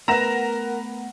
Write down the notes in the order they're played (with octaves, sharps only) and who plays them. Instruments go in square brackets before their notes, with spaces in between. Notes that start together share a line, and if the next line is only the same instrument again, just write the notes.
[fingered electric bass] A3 B3 [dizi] A#4 [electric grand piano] B4 A#5 [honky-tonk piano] F#5 A#6 E7